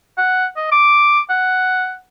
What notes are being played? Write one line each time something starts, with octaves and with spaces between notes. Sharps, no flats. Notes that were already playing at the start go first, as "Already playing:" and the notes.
F#5
D#5
D6
F#5